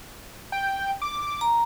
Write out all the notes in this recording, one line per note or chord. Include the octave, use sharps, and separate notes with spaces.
G5
D6
A#5